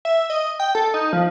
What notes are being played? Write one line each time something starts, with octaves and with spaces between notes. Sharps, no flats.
E5
D#5
G5
A4
D#4
F3